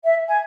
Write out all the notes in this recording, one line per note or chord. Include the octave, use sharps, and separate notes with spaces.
E5
G#5